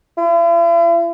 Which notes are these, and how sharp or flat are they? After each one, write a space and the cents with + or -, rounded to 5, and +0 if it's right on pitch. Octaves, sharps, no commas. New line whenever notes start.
E4 +45